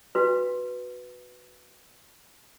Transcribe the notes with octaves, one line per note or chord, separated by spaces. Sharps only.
F#4 B4